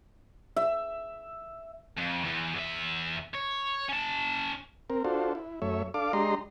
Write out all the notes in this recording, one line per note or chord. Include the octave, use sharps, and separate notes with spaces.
E5
F2
E2
E2 E5
C#5
C#4 A5
C4 A#4
D4 F4 F#4 A4 C5
E4
F#2 A3 C#5 E5
D4 A4 F5 D6
G#3 D4 G4 D#5 A#5 C6